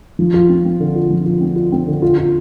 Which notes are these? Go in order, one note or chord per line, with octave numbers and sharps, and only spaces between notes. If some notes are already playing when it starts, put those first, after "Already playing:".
F3
F4
C4
C4
D3
F4
F3
F4
C4
F4
C4
D3
F4
F4